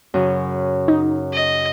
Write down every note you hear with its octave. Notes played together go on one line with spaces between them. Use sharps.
F#2 C#3
D#4
D#5